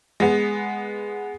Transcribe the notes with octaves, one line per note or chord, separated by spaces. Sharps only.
G#3 B3